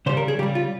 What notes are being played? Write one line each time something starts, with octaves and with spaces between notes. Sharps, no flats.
C#3 G3 C5
A#4
G#4
C#3 G3 G4
F4